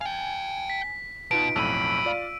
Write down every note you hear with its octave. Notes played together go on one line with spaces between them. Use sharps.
F5 G5 G#5
B6
B2 D#4 F4 B4 D7
B1 F2 A2 A3 B5 E6 D#7
F4 D5 F5